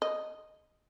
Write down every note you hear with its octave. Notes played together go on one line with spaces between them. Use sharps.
D#5